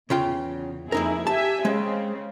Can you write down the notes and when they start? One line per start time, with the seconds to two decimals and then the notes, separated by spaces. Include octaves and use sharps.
0.10 E2 C#3 F4 G5
0.92 F2 A#3 D#4 E4 G#4 A#4
1.27 G4 E5 G#5 A5
1.65 C#3 G#3 C4